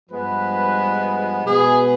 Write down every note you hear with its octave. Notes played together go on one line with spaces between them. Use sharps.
G2 F3 G#3 B3 B4
B2 G#3 B3 G#4